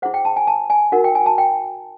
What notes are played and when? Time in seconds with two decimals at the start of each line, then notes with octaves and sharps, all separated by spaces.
0.02 E4 G#4 C5 F#5
0.14 G5
0.25 A5
0.36 G#5
0.47 A5
0.70 G#5
0.92 D#4 F#4 A#4 F#5
1.04 G5
1.15 G#5
1.26 A5
1.38 G5